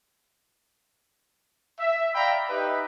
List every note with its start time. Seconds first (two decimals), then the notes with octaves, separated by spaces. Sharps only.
1.79 E5
2.14 D5 F5 G5 A#5 B5
2.49 D#4 G4 B4 E5